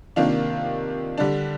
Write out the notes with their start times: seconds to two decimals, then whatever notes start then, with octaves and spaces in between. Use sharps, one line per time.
0.16 C3 D#3 A#3 D4 F4
1.17 D3 G3 D4